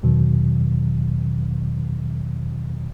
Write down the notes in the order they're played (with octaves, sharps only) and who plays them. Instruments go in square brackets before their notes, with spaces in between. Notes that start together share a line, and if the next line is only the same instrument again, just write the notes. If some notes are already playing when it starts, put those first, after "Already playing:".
[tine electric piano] E2 B2 D#3 F#3